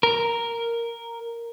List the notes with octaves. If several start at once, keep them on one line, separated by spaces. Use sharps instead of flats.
A#4